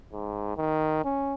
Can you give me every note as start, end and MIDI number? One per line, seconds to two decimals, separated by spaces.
0.13 0.54 44
0.57 1.01 51
1.04 1.35 61